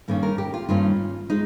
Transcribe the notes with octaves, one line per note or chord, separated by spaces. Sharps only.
G2 D#3 A#3 C#4
A#4
G4
F4
G2 D#3 A#3 C#4 F4
G#3 D#4